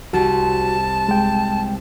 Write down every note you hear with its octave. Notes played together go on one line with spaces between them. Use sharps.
C2 C4 F#4 A5 E7
G#3 G5